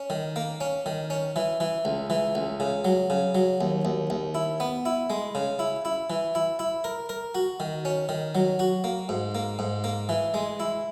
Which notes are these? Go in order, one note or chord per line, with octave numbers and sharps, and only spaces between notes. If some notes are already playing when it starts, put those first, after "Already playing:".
Already playing: C#4
D#3
A#3
C#4
D#3
C#4
E3
E3
C#2
E3
C#2
C#3
F#3
C#3
F#3
D#2
D#2
D#2
E4
B3
E4
G#3
C#3
E4
E4
E3
E4
E4
A#4
A#4
F#4
D#3
C#4
D#3
F#3
F#4
A#3
G#2
A#3
G#2
A#3
E3
G#3
E4